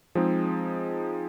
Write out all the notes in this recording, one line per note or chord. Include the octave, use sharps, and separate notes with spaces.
F3 G#3 C4 D#4 G#4